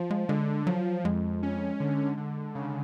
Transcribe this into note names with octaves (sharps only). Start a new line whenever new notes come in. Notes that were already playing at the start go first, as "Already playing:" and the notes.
Already playing: F3
G#3
D3 G#3
F3 F#3
F2 G#3
C#4
D3
D3
C#3